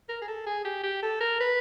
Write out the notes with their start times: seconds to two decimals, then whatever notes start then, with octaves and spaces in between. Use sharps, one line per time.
0.09 A#4
0.22 G#4
0.28 A4
0.46 G#4
0.65 G4
0.83 G4
1.02 A4
1.21 A#4
1.40 B4